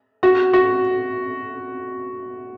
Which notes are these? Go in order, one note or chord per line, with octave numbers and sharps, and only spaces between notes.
F#4
F#4